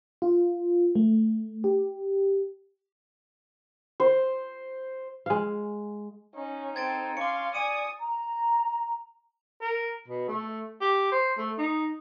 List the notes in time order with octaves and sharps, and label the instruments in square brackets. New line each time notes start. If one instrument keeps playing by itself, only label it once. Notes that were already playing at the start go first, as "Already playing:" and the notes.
[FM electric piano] F4
A3
G4
[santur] C5
[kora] G#3 F5
[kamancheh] C#4 [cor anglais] D#4
[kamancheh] C4 A4 [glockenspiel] G#6 A6 D7
[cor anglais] C#4 [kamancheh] F5 C6 [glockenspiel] D6 C#7
[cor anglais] D5 [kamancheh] G#5 D#6 [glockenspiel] C#7 D#7
[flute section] A#5
[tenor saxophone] A#4
B2
A3
G4
C5
A3
D#4